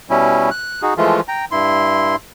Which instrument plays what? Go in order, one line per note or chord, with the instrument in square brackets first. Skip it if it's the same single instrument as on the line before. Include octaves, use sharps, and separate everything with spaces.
[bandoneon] B2 G3 C#4 E4
F#6
D#4 F#4 G#4
E3 F3 G#3 A3 F4
G5 A#5
G2 E4 C6